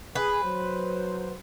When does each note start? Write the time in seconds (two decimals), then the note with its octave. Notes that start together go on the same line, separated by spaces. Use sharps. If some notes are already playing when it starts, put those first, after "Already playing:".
0.15 G#4 B4
0.44 F#3 C5